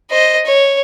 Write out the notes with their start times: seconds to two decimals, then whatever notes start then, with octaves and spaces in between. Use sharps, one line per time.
0.11 C5 D#5
0.45 C#5